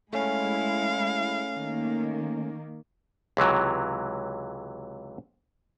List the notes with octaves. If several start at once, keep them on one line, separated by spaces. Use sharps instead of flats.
G#3 A3 C#4 E4 F5
D#3 A#3
C#2 C3 E3 F#3